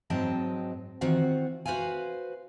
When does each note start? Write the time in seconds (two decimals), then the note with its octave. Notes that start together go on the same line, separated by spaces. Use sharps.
0.10 G#2 F#3 C4 D#5 G5 A5
1.01 D#3 E3 C4 F4 F#4 F#5
1.66 F#4 B4 C5 F5 G#5